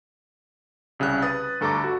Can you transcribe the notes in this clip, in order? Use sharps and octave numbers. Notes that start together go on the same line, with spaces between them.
C2 C#3 G3 F#6
B4 D#6 A6
D2 G2 A4 A#5 C#6 D6
F#4